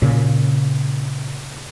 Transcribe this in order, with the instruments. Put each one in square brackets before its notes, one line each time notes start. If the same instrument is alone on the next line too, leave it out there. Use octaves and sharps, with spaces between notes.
[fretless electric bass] A#2 C#3